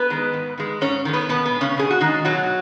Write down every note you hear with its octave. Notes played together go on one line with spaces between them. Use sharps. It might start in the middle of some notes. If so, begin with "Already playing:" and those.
Already playing: B3 B4
D#3 G#3
G#2
D#3 G#3
G#2 C#4 C#5
D#3 G#3
B3 B4
B2 B3
B3
G#3
C#3 C#4
B2 G#4
F#4
D#3 G#3 D#4
B2 F#3 F#4